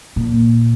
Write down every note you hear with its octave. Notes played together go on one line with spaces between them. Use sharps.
A#2